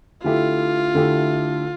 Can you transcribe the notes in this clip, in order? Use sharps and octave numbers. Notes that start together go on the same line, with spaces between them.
D3 A3 E4 F4 G4
D3 A3 E4 G4